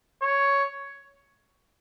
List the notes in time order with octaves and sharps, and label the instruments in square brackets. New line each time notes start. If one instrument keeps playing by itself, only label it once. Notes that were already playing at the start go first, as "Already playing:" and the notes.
[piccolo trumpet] C#5